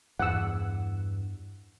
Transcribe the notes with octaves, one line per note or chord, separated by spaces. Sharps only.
E2 G2 F#5 E6